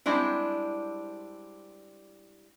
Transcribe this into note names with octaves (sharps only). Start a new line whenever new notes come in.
G3 G#3 C4 D4 E4